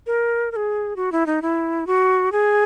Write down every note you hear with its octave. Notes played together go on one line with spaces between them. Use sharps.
A#4
A#4
G#4
F#4
E4
D#4
E4
F#4
G#4